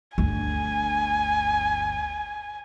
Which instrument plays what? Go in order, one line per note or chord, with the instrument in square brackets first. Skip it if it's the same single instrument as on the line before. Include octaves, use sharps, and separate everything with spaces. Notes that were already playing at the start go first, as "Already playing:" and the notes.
[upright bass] G1 D2 [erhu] G#5